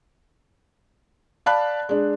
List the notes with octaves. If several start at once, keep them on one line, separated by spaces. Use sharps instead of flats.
D5 F5 A5 B5 F#6
G#3 D4